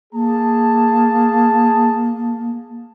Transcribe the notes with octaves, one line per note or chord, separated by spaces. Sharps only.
A#3 G#4 A5